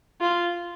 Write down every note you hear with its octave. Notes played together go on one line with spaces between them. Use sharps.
F4